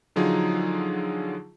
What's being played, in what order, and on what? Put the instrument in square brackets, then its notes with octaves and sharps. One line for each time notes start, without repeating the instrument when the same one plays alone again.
[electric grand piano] D3 F3 F#3 D#4 F4 G#4